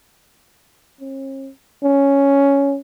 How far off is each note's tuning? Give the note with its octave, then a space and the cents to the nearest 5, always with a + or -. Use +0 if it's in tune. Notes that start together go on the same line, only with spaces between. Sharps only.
C#4 -45
C#4 +5